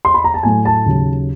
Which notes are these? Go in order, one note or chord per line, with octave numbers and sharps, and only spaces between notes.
C6
B5
A#5
A5
A2 F#3 A3 G#5
A5
D#2 C#3 F#3